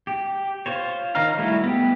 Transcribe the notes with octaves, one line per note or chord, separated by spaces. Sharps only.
G4
F4 C5 C#5
D#3 D#5 F5 A#5 F6
G3 A3 E4 F#4
B3 G4